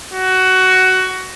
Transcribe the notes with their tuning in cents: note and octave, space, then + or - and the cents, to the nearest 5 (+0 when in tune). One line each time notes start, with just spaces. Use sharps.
F#4 +15